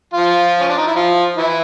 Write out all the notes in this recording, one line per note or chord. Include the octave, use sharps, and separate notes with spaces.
F3 F4
C#4
D4
D#4
E4
F3 F4
E3 E4